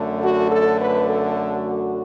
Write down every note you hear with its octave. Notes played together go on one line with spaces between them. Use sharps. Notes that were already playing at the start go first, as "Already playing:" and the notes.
Already playing: F#2 D3 A3
F#4
A4
B4
A4
F#4